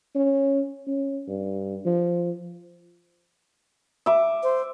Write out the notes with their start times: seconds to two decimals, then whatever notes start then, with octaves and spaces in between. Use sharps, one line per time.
0.15 C#4
0.87 C#4
1.28 G2
1.86 F3
4.06 E5 D6
4.43 C5